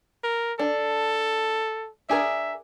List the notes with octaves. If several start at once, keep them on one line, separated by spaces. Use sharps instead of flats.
A#4
D4 A4
D4 G#4 A#4 E5